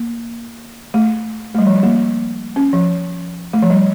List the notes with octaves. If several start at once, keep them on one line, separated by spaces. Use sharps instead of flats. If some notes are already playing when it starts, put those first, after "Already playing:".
Already playing: A#3
A3
A3
G3
F3
G3
A#3
C#4
F3
A3
F3
G3